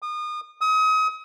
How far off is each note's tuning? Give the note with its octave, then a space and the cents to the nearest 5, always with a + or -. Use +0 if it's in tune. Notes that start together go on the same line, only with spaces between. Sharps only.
D#6 -35
D#6 +35